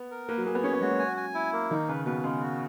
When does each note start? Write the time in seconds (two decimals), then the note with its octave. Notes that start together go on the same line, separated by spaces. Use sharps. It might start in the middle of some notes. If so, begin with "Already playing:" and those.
Already playing: B3
0.11 A#4
0.28 A#3 B4
0.38 F#3
0.46 A#3 G#4
0.55 B3
0.64 C#4 C#5
0.73 B3
0.81 G#3 F#4
0.91 F#3
0.99 G#5
1.17 G#5
1.34 E4
1.53 A#3
1.70 D#3 D#4
1.88 C#3 B4
2.06 B2 B4
2.23 C#3 G#3
2.41 F#4